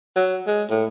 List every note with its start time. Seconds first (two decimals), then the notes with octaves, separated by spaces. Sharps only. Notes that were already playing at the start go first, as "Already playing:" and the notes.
0.16 F#3
0.47 G#3
0.70 A2